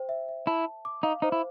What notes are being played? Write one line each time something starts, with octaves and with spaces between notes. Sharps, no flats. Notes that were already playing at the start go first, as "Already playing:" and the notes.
Already playing: C5 G5
E5
E5
E4 A5
A5
D6
D#4 F5
D#4 C5
E4